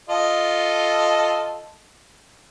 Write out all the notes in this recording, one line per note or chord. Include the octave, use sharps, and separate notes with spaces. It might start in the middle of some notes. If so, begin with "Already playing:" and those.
F4 A4 D#5